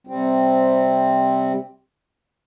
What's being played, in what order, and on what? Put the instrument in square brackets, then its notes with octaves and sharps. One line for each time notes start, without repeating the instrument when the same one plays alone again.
[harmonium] C3 G3 C4